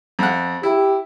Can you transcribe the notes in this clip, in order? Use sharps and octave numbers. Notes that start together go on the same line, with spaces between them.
F2 F#5
E4 G4